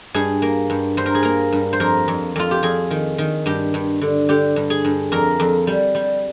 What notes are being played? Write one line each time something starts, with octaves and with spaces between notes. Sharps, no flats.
G2 G#4
A#3
G2
G2 C5
A#4
G#4
A#3 A#4
G2
C5
F2 A#4
F2
F2 F4
G4
F2 G#4
D#3
D#3
G2 G4
G2
D3
D3 G4
G2
G#4
G2
F2 A#4
F2
G3
G3